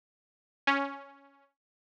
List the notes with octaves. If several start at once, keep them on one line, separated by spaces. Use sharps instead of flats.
C#4